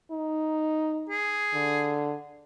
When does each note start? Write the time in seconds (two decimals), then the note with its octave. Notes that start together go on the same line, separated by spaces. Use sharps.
0.11 D#4
1.10 G#4
1.54 D3